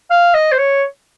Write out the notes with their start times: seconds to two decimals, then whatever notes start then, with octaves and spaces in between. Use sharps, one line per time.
0.11 F5
0.34 D#5
0.52 C5
0.58 C#5